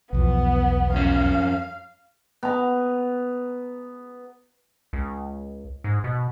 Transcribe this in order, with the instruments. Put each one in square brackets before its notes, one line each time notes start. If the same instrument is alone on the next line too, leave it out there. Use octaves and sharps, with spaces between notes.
[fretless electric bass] B1 E2 F3 [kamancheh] B3
[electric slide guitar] F2 C#4 [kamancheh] F5
[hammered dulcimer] B3 A#5
[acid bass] C#2
G#2
B2